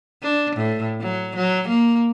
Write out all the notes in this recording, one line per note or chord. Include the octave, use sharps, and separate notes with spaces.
D4
A2
F#3
F#3
A#3